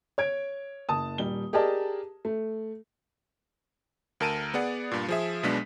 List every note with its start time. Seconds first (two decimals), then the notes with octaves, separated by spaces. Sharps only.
0.18 C#5 G#6 D7
0.89 F#1 A5 D#6
1.18 D#1 G3 G7
1.53 G4 G#4 A#4 D5 D#5 A5
2.25 A3
4.20 D2 A#4 A5 D7 D#7
4.54 B3 G#4 D5 F#5
4.91 G2 A#2
5.08 F3 G#4 E5
5.43 B1 B2 G#3 B3 D4 B6